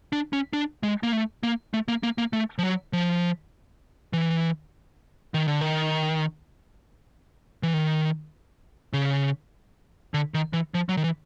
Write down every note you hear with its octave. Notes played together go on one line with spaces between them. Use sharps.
D4
C#4
D4
G#3
A#3
A3
A#3
A3
A#3
A#3
A#3
A3
F3
F#3
F3
E3
D#3
D3
D#3
E3
D#3
C#3
D3
D#3
E3
F3
F#3
D#3
E3